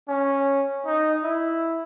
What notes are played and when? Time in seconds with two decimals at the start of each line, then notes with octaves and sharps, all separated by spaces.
0.08 C#4
0.86 D#4
1.24 E4